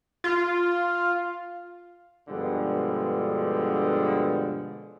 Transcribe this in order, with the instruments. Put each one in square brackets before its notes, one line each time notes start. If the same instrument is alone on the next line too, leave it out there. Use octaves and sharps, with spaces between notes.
[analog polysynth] F4
[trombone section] G2 B2 D3 F3 G#3